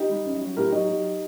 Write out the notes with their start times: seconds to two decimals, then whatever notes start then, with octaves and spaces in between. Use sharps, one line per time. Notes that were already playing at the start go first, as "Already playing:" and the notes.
Already playing: D#4 G4
0.09 G3
0.25 F#2
0.41 F#3
0.56 A2 G4 A#4
0.72 F#3 D#4 G4
0.89 F#3